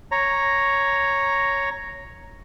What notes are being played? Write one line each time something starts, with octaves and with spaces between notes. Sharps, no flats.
C#5 A#5